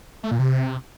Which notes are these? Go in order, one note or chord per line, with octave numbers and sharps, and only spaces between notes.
A3
A#2
C3